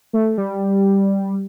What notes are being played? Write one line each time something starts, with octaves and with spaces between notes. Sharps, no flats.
A3
G3